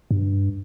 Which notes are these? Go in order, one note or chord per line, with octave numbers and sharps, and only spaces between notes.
G2